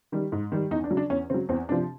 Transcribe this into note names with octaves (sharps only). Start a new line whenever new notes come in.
D#3 G3
G#2
D#3 G3
E2 D#4
D4
C#3 F#3
D4
E2 C#4
C#3 F#3 C4
E2 C4
C3 F3 D4